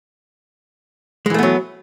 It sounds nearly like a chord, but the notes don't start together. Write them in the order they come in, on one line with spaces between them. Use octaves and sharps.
G#3 E3 A3 B3 F#3